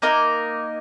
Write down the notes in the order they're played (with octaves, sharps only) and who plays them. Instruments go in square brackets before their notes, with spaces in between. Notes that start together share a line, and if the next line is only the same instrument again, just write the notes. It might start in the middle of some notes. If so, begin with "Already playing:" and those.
[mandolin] A#3 D#4 A#4